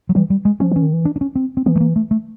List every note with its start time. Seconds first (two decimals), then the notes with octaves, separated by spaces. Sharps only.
0.09 F#3
0.15 E3 G3
0.30 G3
0.45 G#3
0.60 F3 C#4
0.71 E3 C#4
0.82 D#3
0.93 E3
1.05 D4
1.16 D4
1.21 C#4
1.35 C4
1.57 C4
1.66 E3 B3
1.75 A3
1.80 A#3
1.96 A3
2.11 A3